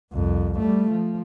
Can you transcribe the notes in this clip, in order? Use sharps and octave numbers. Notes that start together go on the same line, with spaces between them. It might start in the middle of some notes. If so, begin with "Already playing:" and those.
C2 F2
G3 A3
F3